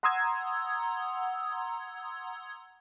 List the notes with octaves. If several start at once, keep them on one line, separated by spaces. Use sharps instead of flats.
F#5 A#5 C6 D#6 E6 G#6